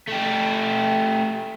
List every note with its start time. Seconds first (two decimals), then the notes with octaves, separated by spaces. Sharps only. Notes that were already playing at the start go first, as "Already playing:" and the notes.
0.08 A3 G4